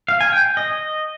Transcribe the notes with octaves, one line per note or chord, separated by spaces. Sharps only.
F5
G#5
G5
D#5